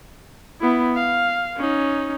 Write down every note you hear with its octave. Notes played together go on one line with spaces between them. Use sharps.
B3 E4
F5
C#4 D#4